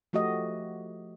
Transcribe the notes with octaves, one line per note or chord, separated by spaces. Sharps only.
F3 A3 F#4 G4 D#5